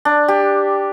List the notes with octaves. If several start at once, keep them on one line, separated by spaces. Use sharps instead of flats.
D4
G4